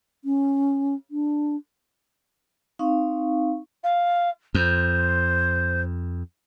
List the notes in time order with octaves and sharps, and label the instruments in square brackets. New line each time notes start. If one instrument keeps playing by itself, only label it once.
[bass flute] C#4
D4
[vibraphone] C4 D#4 F5 C#6
[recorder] F5
[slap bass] F2 [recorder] C5